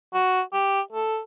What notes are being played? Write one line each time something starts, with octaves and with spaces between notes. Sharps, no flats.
F#4
G4
A4